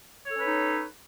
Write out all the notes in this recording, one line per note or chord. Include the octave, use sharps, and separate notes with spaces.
C#4 D#4 A4 B4 C#5